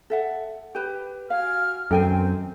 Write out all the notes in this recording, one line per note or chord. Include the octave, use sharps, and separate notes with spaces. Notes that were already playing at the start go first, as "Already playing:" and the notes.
A4 E5 F#5
G4 B4
F#4 F5 G#5 F6
F#2 D#3 C4 A4 G5 G#5